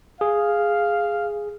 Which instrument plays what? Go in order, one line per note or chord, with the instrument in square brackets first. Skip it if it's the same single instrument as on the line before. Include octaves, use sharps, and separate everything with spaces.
[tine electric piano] G#4 [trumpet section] F5